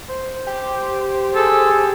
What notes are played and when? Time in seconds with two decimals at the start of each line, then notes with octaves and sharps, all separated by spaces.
0.09 C5
0.47 G4
1.35 G#4 A4